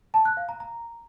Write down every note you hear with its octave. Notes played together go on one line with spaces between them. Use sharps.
A5
F#6
F5
A#5
A#5